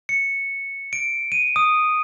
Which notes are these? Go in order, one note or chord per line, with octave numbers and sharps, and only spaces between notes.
C#7
D7
D#7
D#6